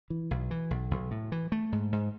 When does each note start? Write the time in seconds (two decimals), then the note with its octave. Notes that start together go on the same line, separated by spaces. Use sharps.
0.10 E3
0.31 B1
0.51 E3
0.71 B1
0.91 B1
1.11 A2
1.32 E3
1.52 A3
1.72 G#2
1.92 G#2